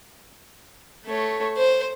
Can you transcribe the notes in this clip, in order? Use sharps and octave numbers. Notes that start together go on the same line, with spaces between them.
A3 C#5
C5